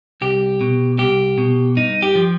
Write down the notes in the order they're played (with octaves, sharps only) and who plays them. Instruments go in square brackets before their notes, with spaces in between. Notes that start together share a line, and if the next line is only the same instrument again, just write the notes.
[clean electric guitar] C2 G4
B2
C2 G4
B2
G2 D#4
G4
F3